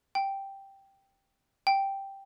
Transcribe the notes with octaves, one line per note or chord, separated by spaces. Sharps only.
G5
G5